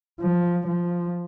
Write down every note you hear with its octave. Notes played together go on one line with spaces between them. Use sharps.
F3
F3